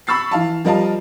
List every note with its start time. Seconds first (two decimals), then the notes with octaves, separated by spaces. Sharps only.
0.07 B5 C#6 E6 A6 C7
0.31 E3 F5 A5
0.65 F3 G3 A#4 D#5 F5 A5